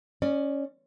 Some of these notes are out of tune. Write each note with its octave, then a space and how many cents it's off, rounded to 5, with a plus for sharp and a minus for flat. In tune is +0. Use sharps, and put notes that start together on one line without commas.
C#4 +0 D5 +25